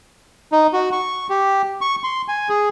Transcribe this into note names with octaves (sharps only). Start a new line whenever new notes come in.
D#4
F#4
C#6
G4
C#6
C6
G#5
G#4